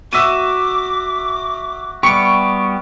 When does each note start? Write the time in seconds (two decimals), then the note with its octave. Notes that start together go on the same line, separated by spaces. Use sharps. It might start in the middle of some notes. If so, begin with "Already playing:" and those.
0.13 F#4 E5 D6 D#7
2.03 G3 B3 G4 C#6 C#7